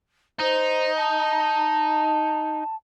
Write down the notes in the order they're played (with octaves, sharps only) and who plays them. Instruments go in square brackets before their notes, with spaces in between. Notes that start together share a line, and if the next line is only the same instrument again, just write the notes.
[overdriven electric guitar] D#4 [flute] C5
[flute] A5